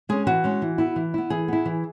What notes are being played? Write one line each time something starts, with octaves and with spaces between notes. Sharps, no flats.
G#3 C#4 G#4
E3 F#4
G#3 C#4
E3
B3 E4
E3
B3 E4
E3 G#4
B3 E4
E3